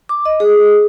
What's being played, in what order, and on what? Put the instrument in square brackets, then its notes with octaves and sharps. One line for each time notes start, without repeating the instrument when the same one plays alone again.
[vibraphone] D6
D#5
G#4